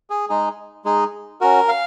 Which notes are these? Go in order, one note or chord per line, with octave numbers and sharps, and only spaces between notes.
G#4
G#3 D#4 G#4
G#3 D#4 G#4
C#4 F#4 A#4
F5